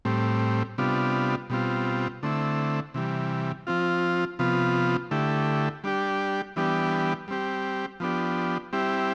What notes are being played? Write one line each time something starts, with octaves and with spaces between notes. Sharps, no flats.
A2 G3 C4
C3 G3 B3 D4 F4
B2 G3 C4 F4
D3 A3 C4 E4
C3 E3 G3
F3 C4 F4
C3 F3 B3 F4
D3 A3 E4 G4
G3 D4 G4
E3 G3 B3 D4 G4
G3 C4 G4
F3 B3 D4 G4
G3 C4 E4 G4